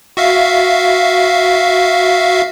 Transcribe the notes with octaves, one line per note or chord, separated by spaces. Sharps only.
F#4 E5 F5